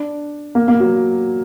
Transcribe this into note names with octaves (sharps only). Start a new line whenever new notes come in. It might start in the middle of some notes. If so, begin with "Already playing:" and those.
Already playing: D4
A#3
A#3
F#3